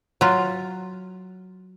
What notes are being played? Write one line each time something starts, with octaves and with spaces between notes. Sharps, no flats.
F#3 F4